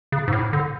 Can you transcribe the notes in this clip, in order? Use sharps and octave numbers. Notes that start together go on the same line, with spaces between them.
C#3
G#2
A2
D3